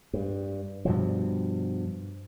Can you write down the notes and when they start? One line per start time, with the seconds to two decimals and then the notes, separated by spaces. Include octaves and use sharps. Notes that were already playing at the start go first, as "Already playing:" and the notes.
0.13 G2
0.85 G2 B2 F3